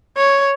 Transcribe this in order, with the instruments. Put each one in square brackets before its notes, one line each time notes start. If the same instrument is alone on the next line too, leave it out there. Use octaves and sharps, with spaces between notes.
[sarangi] C#5